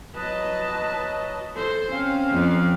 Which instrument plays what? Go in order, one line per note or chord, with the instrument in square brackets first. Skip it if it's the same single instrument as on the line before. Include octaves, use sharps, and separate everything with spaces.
[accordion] F#3 D#5 [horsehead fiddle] B4 A5
[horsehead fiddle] A4 C5
[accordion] C4 F5 [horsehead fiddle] C#4
[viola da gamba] F2